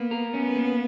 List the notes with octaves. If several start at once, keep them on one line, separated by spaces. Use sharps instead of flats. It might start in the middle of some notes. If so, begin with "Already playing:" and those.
Already playing: A#3 B3
A#4
B3 C#4
A#3